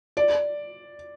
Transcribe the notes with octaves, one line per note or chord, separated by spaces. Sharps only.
D5